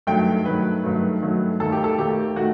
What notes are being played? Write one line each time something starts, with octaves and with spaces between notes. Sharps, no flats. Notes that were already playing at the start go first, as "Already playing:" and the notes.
G2 D#3 F#3 A3 G5
G2 D#3 F#3 A3 B4
G2 D#3 F#3 A3
G2 D#3 F#3 A3
D#2 D#3 A3 A4
G4
A4
D#2 D#3 A3 G4
D#3 A3 F#4